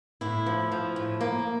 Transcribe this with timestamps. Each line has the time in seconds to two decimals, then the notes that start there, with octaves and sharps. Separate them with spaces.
0.21 A2 E4
0.46 F3
0.72 F3
0.96 A2
1.21 A#3